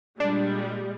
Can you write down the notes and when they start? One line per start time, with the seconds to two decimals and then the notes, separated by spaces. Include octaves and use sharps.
0.20 A#2 G3 G#3 D4